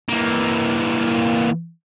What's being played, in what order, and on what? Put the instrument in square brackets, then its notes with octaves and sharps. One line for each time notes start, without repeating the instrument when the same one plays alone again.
[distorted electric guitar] E3 A#3